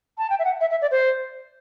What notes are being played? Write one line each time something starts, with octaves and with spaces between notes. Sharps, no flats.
A5
G5
E5
F#5
E5
E5
D5
C5